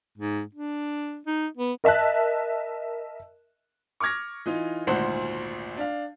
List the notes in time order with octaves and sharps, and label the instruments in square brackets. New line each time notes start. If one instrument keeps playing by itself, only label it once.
[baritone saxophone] G#2
D4
D#4
B3
[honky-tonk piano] A#4 D#5 E5 A5 F#6
[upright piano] C#6 D6 F6 G#6 A#6
E3 D#4 F4
G#1 D2 A#2 C5 F#5
D4 F5